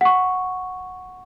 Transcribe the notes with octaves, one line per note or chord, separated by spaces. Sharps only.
F#5 C#6